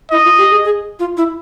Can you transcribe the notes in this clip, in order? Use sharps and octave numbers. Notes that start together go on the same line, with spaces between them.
E4 D#5
F4
G4
G#4
G#4
F4
E4